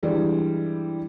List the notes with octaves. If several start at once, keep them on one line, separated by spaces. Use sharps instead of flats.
G2 E3 G3 G#3